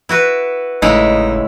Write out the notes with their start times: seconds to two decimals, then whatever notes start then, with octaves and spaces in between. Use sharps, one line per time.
0.09 E4 F#4 B4
0.82 G#1 A2 C#3 G#3 D#4 E4